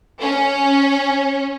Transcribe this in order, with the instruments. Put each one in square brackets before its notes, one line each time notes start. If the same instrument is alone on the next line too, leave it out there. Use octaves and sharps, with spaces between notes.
[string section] C#4